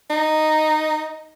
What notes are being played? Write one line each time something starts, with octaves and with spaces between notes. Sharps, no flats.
D#4